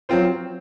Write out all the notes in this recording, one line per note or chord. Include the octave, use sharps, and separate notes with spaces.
F#3 C4 F4 C5